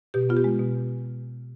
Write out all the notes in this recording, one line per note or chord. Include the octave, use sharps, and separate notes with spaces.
B2 G4
B3 F4
G4
G#3
B2